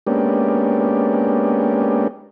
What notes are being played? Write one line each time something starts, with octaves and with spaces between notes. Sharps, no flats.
G#3 A#3 B3 C#4 D4 G4